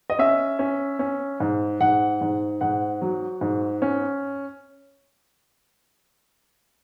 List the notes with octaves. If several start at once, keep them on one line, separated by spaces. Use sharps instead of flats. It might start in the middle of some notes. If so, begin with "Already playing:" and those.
D#5
C#4 E5
C#4
C#4
G#2
G#2 F#5
G#2
G#2 F#5
F#3
G#2
C#4